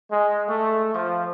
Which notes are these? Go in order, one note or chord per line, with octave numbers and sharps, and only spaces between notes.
G#3
A3
F3